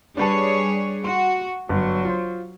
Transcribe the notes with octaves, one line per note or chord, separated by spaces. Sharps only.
G3 D4 G#4 B4 C#5 A5
F#4 C6
G1 F#3
F4 C5